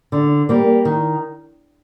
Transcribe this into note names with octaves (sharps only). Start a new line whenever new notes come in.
D3
G3 A#3
D#3